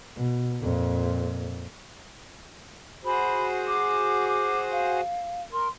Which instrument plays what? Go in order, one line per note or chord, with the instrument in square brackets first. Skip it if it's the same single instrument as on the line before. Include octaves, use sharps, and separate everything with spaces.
[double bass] B2
F2 A#2
[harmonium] F#4 G#4 C5 [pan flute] B5
[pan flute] D6
D6
F5
[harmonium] A#4 [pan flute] C6